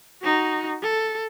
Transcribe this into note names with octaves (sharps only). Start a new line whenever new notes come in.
D#4 F#4
A4